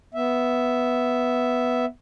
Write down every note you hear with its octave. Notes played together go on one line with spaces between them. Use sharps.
B3 E5